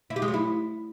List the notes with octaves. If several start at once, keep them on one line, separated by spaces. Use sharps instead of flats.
E4
G4
G#3
F#3
E4